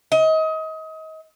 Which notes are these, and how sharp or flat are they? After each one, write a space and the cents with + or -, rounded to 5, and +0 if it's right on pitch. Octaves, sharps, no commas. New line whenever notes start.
D#5 +30